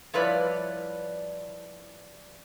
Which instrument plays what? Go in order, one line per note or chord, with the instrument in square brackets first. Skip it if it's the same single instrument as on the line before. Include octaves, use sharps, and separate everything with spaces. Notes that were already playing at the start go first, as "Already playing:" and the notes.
[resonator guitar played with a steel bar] F3 G3 E4 B4 C#5 D5